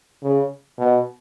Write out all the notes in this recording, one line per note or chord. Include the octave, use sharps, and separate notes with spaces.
C#3
B2